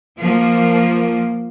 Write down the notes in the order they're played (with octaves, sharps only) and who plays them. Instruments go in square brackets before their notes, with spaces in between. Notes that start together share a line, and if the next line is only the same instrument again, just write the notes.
[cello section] F3 A#3